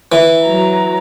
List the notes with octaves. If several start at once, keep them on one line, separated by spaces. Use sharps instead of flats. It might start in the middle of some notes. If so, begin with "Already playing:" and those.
E3
F#3 A#5